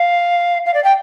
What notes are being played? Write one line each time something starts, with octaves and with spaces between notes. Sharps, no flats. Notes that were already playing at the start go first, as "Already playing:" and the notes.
Already playing: F5
F5
D5
G5